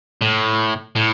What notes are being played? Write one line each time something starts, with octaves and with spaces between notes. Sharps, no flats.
A2
A2